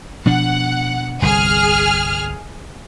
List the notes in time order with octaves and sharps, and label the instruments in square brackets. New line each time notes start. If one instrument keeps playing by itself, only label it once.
[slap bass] B2 F3 D4 [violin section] F#5
[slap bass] G1 C2 [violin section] G#4 F6